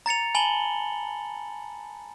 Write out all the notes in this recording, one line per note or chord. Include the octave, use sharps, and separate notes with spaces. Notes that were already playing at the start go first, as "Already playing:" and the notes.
A#5 A6 C#7 F7
G#5 A5 B5 F#7 G7